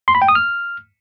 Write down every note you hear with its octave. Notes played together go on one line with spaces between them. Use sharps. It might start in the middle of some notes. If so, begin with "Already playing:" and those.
C6
B5
G5
D#6
F6